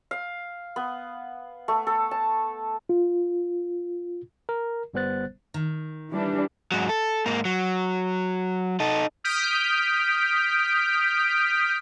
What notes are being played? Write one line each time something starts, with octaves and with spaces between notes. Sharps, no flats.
F5
B3
A3
A4
A5
F4
A#4
G1 G3 B3 C5 F#6 A6
D#3
E3 G3 D4
G#2 F#3
A4
G#2 A#3
F#3
D#4 A4
D#6 F6 G6 B6 D7